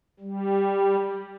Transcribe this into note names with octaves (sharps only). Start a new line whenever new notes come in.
G3